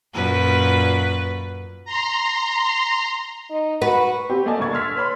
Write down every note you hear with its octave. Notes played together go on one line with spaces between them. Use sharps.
F#2 A#2 B4
A#5 C6
D#4
F#4 B4
C4 G4
A3 A#3 D5 D#5 G#5 A5
D2 A#2 C#6 G#6 A6
C6 E6 F6 B6
B4 C#5 B5 C6